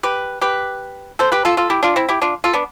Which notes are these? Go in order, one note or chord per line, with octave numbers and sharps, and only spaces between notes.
G4 B4
G4 B4
A4 C5
G4 B4
F4 A4
F4 A4
E4 G4
D4 F4
C4 E4
E4 G4
D4 F4
F4 A4
B3 D4